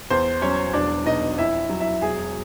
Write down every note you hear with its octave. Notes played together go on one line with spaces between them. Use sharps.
E2 C5
F#3 C#4 C#5
E1 D4 D5
B2 D#4 D#5
F2 E4 E5
F#3
E4 E5
E1 G#4 G#5